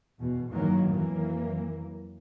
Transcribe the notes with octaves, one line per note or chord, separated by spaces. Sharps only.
E2 B2
G2 D#3 E3 F#3 A#3
F2 E3 F#3 A#3